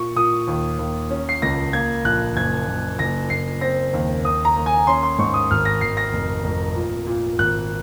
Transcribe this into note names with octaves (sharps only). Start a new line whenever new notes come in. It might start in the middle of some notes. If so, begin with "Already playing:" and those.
Already playing: A#2 C#6
A#2 D#6
D#2
D#2
C#4
C7
C#2 A#6
A#3 G#6
A#1 F#6
F#1 G#6
F#1
F#1 A#6
F#1 C7
C4 A#6
D#2
D#2 D#6
A#5
D#2
G#5
C#4 C6
C6
G#2 C#6
D#6
G#1 F6
A#6
G#1 C7
A#6
F1
F1
A#2
A#2
G#1 F#6